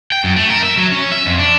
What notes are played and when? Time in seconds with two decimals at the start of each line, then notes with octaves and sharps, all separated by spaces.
0.12 G5
0.24 F#2
0.36 A3
0.50 A#4
0.64 E5
0.77 F#3
0.92 C#4
1.12 E5
1.26 F2
1.39 D4